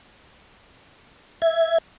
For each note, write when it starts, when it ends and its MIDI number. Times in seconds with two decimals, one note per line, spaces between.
1.42 1.78 76
1.42 1.78 92